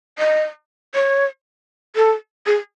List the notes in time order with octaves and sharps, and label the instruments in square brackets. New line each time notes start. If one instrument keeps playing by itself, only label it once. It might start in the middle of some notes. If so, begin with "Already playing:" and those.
[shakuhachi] D#5
C#5
A4
G#4